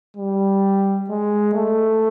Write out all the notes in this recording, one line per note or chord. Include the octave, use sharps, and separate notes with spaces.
G3
G#3
A3